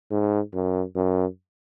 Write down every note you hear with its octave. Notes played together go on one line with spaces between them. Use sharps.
G#2
F#2
F#2